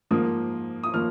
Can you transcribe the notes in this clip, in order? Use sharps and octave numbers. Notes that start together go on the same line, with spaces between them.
G#2 F3 A#3 D#6
D#6
F3 A#3 F6